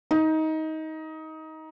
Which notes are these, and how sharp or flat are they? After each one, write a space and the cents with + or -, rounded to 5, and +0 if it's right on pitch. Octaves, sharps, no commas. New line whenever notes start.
D#4 +20